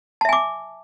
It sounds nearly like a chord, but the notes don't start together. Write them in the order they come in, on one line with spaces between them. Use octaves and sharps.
A5 E5 G#5 D6